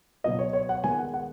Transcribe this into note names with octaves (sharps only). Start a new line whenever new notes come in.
B2 F#3 B3 D#5
C#5
C#5
F#5
D#3 G#3 B3 G#5
F#5
F#5